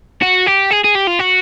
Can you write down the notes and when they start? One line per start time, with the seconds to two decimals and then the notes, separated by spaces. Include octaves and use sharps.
0.23 F#4
0.47 G4
0.71 G#4
0.84 G#4
0.95 G4
1.07 F4
1.19 F#4